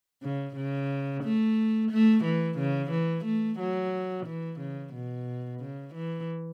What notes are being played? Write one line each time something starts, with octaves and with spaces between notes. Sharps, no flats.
C#3
C#3
A3
A3
E3
C#3
E3
A3
F#3
E3
C#3
B2
C#3
E3